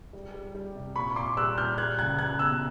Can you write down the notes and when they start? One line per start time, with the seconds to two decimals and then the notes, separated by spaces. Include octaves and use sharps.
0.13 G3
0.34 G3
0.55 G3
0.75 C3
0.96 A#2 B5 C#6
1.16 A#2 C6 D6
1.37 G3 E6 F#6
1.58 A#2 F6 G6
1.77 G3 F#6 G#6
1.99 C#2 F#6 G#6
2.19 C#2 F#6 G#6
2.39 B2 E6 F#6